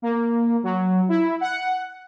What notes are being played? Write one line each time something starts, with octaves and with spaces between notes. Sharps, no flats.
A#3
F#3
E4
F#5